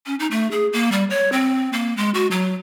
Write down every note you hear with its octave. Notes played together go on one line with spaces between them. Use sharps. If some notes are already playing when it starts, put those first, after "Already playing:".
C#4
D#4
A3
G#4
A#3
G3
C#5
C4
A#3
G#3
F#4
F#3